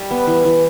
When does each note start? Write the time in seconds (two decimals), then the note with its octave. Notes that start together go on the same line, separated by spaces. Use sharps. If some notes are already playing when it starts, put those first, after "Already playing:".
Already playing: G3
0.11 B3
0.27 E3
0.45 E3